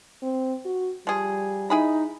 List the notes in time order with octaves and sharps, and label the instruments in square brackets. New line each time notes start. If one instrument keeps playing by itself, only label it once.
[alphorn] C4
F#4
[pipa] F3 G#4 [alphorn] G3
[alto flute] D#4 [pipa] E4 G#4 B5